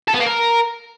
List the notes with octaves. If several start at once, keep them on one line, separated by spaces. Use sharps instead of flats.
A4
B3
A#3
A#4